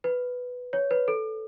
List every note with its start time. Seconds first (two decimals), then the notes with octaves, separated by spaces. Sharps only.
0.04 B4
0.73 C#5
0.91 B4
1.08 A4